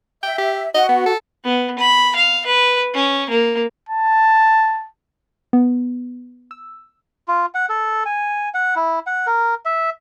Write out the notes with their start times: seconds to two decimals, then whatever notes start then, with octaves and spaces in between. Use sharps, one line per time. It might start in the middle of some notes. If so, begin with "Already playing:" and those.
0.23 E5 G5
0.38 G4
0.74 F#4 D#5 F#5
0.89 B3
1.06 A4
1.44 B3
1.79 B5
2.16 F5
2.46 B4
2.94 C#4
3.30 A#3
3.89 A5
5.53 B3
6.51 E6
7.28 F4
7.55 F#5
7.69 A4
8.06 G#5
8.54 F#5
8.76 E4
9.07 F#5
9.27 A#4
9.65 E5